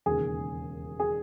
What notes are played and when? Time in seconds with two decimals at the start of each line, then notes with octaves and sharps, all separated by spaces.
0.06 E1 D#2 C#3 G#4
1.00 G#4